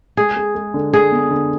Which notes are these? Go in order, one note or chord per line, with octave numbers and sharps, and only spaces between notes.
G#3 G#4
G#3
G#3
D3
D3 G#4
B3
D3